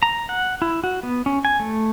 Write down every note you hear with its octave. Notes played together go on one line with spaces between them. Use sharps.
A#5
F#5
E4
F#4
B3
C#4
G#5
A3